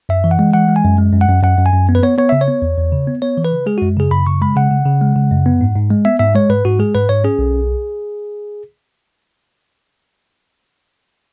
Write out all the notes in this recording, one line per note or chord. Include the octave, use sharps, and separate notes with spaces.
F#2 E5
E3
F#5
G#3
E3 F#5
G#3
G#5
F#2
G#3
F#2
F#5
F#2
F#2 F#5
F#2
G#5
F#2
B3
B4
B3 C#5
B3 C#5
C#3 E5
C#5
B3
E2
E2
C#3
B3
B3 C#5
E3
B4
C#3
G#3 G#4
F#2 F#4
C#3 G#4
F#2 B5
C#3 C#6
G#3 B5
C#3 F#5
C#3
C#3
G#3
C#3
F#2
B3
G#2
G#2
G#3
B3 E5
G#2 E5
G#3 C#5
G#2 B4
G#2 F#4
G#3 G#4
G#2 B4
G#2 C#5
C#4 G#4
B1